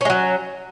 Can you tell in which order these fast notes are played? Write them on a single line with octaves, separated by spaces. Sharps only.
C#4 G#3 F#3